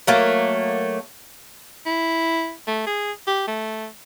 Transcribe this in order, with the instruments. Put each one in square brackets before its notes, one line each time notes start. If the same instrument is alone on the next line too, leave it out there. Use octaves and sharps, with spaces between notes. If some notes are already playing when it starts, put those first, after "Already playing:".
[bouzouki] F#3 A3 A#3
[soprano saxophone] E4
A3
G#4
G4
A3